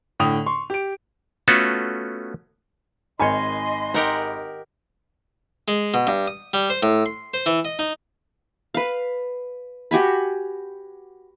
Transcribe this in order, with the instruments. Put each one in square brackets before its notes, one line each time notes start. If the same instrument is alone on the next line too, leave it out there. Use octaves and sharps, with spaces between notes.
[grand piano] A2 D3 G5 D#6 F7
C6 C#6
G4 D7
[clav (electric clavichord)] A3 B3 C#4 F4 F#4 A4
[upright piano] G#1 G#5 B5 [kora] D#3 C#5 [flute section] D#5 C6
[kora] D#4 [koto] G4 A#4 F#5
[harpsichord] G#3
B2
G2
D#6
G3
C5
A2
C6
C5
E3
D#5
D#4
[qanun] B4 F5
F#4 G4 G#5 B5